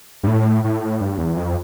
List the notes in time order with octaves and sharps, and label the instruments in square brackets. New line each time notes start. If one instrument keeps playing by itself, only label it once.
[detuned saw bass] G2
A2
A2
G2
E2
F2